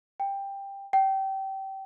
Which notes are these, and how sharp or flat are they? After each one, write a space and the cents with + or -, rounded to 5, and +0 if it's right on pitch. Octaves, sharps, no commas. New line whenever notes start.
G5 +15
G5 -25